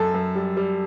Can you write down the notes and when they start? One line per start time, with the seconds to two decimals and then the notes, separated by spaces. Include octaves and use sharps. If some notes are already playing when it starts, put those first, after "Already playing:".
Already playing: F#2 A4
0.14 F#2
0.35 G3
0.57 G3